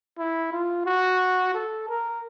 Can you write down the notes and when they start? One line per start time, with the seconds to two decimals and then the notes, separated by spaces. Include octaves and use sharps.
0.18 E4
0.52 F4
0.86 F#4
1.55 A4
1.89 A#4